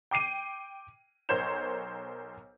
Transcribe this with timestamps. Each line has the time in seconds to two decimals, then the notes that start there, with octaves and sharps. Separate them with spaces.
0.11 G5 D6 C7 D#7
1.29 B1 A#4 C5 C#5 G6 E7